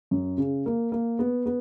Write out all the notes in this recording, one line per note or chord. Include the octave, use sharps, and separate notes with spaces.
F#2
C#3
A#3
A#3
B3
B3